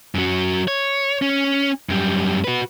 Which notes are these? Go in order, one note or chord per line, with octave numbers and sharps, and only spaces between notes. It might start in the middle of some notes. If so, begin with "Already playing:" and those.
F#2 F#3
C#5
C#4
F#2 G3
F#4 B4